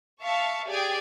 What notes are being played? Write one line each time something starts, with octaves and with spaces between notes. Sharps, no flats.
E5 F5 A5 C#6
G4 G#4 D5 G5 G#6